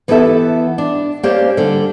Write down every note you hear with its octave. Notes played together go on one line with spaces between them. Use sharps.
E3 B3 E4 G4 A4 E5
D4
A#3 C#4 G4 C5 D5 F5
D3 G3 D4